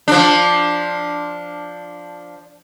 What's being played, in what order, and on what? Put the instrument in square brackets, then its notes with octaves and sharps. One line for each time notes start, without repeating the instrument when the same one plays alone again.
[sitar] F3 D4